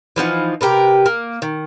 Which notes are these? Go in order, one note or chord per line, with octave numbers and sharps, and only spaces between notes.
E3 F3 D#4 F#5
C3 G4 A#4 B4
A#3
D#3